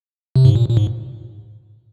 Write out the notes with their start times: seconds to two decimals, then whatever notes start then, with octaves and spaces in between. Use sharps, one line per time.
0.36 C3
0.45 G#2
0.56 A#2
0.69 A#2
0.77 G#2